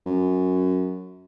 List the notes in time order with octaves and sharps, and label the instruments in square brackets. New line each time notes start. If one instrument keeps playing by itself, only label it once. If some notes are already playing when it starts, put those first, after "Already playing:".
[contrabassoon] F#2